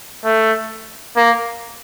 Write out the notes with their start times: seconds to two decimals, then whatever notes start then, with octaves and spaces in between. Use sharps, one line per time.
0.25 A3
1.17 A#3